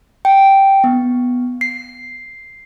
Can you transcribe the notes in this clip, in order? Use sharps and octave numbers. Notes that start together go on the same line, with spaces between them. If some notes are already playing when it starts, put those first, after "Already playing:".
G5
B3
C7